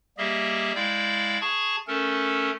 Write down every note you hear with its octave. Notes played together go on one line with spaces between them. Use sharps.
G3 A#3 G4 G#4 D#5 E5
G#3 E4 D5 F5 G5 G6
G#4 A5 C#6 G#6
A3 C#4 A4 A#4